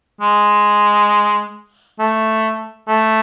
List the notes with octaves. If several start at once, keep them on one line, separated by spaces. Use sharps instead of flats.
G#3
A3
A3